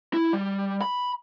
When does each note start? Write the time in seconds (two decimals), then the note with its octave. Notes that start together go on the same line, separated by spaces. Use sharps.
0.14 E4
0.33 G3
0.82 B5